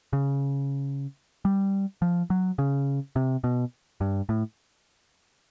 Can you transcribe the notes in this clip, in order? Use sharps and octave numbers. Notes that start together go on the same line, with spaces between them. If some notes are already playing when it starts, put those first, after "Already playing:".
C#3
G3
F3
F#3
C#3
C3
B2
G2
A2